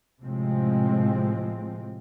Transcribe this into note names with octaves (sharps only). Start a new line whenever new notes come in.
A2 C3 F3 G#3 C4